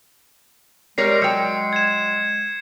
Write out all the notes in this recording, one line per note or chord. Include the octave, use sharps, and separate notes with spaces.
G3 G#3 A#4 C#5 C7
F#3 G5 C#7
G#6 E7